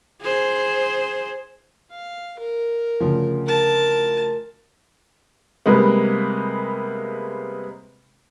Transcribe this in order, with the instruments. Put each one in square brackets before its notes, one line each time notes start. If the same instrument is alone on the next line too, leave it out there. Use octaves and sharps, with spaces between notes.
[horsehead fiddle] G#4 C5
[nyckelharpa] F5
A#4
[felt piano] D2 C#3 F3
[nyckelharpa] A#4 A5
[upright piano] C3 G3 G#3 A#3 B3